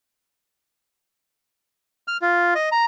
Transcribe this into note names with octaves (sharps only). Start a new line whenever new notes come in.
F6
F4
D#5
A#5